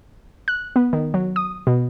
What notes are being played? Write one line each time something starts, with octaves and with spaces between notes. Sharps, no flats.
F#6
B3
D#3
F#3
D#6
B2